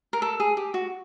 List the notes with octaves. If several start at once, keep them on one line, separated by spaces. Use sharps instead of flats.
A#4
A4
G#4
G4
F#4